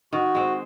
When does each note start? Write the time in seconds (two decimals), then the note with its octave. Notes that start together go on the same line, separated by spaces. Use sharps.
0.13 D#3 F#4
0.35 G#3 C4